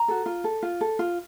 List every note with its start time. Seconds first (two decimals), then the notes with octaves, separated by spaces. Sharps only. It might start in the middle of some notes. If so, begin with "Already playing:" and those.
Already playing: A#5
0.08 F#4 A4
0.26 F4
0.44 A4
0.63 F4
0.81 A4
0.99 F4